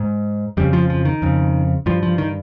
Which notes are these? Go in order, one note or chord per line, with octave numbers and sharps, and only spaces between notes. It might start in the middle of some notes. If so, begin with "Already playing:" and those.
Already playing: G#2
F2 C#3 G3
F3
F3
D#3
F2 C#3
G2 F3
F3
D#3